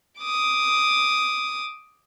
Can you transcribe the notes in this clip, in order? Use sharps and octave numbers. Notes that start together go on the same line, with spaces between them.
D6 D#6